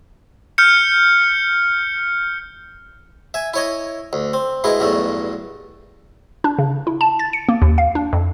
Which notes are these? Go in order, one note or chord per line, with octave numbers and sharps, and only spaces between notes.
F6 G6 C#7
E5 G#5
E4 C#5 D#5
D2
C4
B2 G#3 B3 E4
B1 E2 G2 A3
D4
C#3
E4
A5
A6
C#7
A#3
D#2
F5
D4
F2